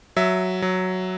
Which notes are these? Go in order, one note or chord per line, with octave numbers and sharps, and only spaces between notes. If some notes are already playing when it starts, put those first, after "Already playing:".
F#3 E5
F#3